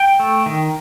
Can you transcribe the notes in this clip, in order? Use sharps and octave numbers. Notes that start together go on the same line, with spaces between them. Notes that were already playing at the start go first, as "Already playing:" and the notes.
Already playing: G5
A3
D#3